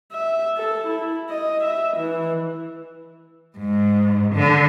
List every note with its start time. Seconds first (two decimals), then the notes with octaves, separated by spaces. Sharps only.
0.13 E5
0.57 A4
0.87 E4
1.30 D#5
1.64 E5
1.97 E3
3.58 G#2
4.34 D3